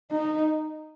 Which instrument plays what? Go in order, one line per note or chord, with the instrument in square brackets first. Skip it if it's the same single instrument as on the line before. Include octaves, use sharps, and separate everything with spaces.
[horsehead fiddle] D#4